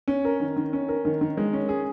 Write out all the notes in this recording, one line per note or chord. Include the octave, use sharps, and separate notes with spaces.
C#4
A#4
D#3
D#3
C#4
A#4
D#3
D#3
G#3
C#4
G#4